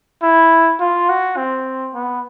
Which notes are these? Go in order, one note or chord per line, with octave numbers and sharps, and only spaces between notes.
E4
F4
F#4
C4
B3